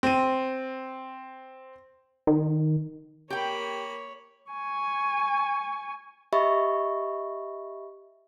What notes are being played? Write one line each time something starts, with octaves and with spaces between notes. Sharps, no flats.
C4 D#7
D#3
A#3 G4 C#5 G5 B5
G#5 C#6
G4 D#5 E5 B5 C#6